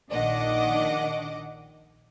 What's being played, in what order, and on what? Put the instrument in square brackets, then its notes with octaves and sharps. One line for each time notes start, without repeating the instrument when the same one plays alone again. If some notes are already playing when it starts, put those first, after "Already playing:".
[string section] A#1 D#3 D4 D#5 F#5 D6